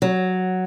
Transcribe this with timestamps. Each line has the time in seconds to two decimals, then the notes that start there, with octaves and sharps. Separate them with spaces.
0.02 F#3